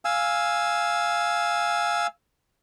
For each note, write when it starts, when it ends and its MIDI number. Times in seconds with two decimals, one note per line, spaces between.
0.05 2.07 77
0.05 2.07 80
0.05 2.07 88